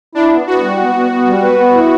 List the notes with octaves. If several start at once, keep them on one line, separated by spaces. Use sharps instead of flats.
D4 E4
B3
B3 F#4
G3
B3
B3
B3
G3
B4
B3
E4